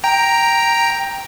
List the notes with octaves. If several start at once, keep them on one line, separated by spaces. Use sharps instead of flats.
G5 A#5